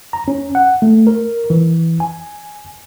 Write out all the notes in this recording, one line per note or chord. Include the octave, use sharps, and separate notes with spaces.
A#5
C#4
F#5
A3
A#4
E3
G#5